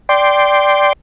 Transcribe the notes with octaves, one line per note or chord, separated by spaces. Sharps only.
D5 G5 C6